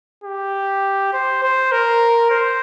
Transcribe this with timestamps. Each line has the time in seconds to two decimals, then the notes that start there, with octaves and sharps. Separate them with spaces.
0.24 G4
1.13 C5
1.43 C5
1.72 A#4
2.31 C5